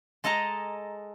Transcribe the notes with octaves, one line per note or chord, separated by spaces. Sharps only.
G#3 A4 D#5 A5 A#5